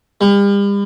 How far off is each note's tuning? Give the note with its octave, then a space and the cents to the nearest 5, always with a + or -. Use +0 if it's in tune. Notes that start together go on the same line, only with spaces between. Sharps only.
G3 +40